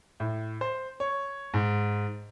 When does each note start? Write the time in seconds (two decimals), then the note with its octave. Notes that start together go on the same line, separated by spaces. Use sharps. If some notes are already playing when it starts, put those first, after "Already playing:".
0.20 A2
0.61 C5
1.00 C#5
1.54 G#2